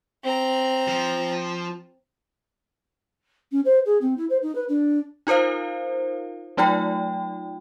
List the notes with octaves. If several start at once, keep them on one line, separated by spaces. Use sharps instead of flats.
C4 A#5
F3
C#4
C5
G#4
C4
E4
C5
D#4
B4
D4
D#4 F4 A#4 C5 F5
F#3 A3 D#4 F4 G5